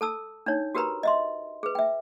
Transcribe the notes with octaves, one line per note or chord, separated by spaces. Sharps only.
A4 A5 E6
D4 D#4 C#5
F#4 G4 A#4 B4 A#5 B5
D#5 E5 C6
G#4 B4
E5 G5